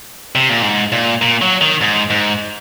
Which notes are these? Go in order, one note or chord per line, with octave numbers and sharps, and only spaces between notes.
C3
A#2
G#2
A#2
A#2
F#3
D#3
G#2
G#2